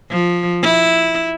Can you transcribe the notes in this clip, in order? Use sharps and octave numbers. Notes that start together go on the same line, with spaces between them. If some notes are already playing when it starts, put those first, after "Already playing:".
F3
E4